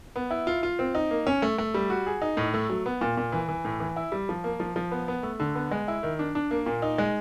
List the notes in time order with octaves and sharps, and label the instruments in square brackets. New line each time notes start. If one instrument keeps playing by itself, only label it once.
[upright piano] B3
E4
F4
F4
C4
D#4
A#3
C#4
A3
A3
G3
F#4
G#4
D#4
A2
A3
F#3
B3
A#2
A#2
E3
E3
A2
E3
E4
G3
F3
A#3
F3
F3
B3
B3
A3
D3
B3
G#3
E4
D#3
D4
D4
A#3
A#2
D#4
G#3